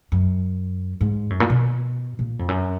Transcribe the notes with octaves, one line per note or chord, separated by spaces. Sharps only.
F#2
G#2
F#2
A#2
B2
A#2
F2
F#2